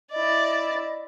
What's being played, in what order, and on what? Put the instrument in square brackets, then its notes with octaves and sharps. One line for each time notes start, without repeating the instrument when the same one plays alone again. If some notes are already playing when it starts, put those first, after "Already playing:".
[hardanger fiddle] E4 D5 [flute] D#5